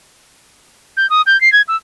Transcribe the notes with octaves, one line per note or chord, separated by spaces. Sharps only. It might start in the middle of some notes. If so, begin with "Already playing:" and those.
G6
D#6
G6
C7
G#6
E6